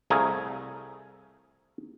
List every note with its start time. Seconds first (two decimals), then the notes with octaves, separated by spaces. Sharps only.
0.10 C2 A3 G#4 F5 A#5